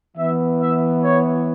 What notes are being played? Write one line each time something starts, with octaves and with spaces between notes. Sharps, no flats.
E3 B3 E5
E5
C#5